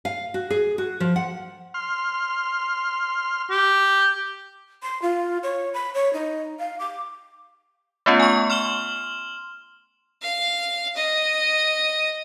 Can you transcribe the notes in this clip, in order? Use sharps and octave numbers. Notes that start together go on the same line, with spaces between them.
F5
F#4
G#4
F#4
F3
F#5
C6 F6
G4
C6
F4
C#5
B5
C#5
D#4
F5
D6
A3 B3 C#4 F4
G#5 C#6
C6 F6 E7 F#7 G7
F5
D#5